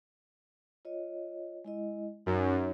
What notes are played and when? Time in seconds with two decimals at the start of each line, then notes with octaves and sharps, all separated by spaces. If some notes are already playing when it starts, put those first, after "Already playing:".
0.85 F4 C#5 D#5
1.65 G#3 E4 D#5
2.26 F#2 D#4 C#5